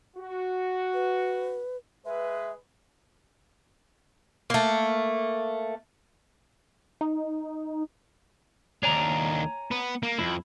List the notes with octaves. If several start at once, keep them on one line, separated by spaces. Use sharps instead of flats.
F#4
B4
G#3 G#4 B4 E5
A3 A#3
D#4
D#2 D4 C#5 G#5 A#5
B3
A#3
F2 E4